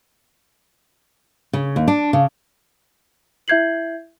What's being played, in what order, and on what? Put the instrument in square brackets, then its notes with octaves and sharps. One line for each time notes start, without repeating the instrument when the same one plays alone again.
[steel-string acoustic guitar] C#3
D#2
D4
C#3
[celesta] E4 E5 G6 G#6 C7 F#7